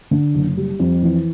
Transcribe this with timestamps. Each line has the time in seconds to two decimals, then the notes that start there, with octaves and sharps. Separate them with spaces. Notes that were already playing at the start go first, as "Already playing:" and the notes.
0.11 D3
0.35 F#1
0.57 G3
0.80 F2
1.03 E3